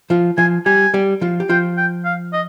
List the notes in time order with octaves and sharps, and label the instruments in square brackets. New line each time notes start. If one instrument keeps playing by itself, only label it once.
[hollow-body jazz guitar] F3 F4
[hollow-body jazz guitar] F3 F4 [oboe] G#5
[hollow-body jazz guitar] G3 G4 [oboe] G#5
[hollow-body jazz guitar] G3 G4
F3 F4
G4
[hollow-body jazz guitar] F3 F4 [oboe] G5
[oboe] G5
F5
D#5